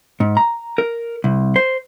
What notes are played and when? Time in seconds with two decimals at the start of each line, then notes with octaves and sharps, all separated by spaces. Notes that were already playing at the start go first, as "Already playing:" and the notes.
0.20 G#2
0.37 A#5
0.78 A#4
1.24 C2
1.56 C5